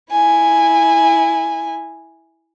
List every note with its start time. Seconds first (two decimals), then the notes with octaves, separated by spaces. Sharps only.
0.12 E4 G#5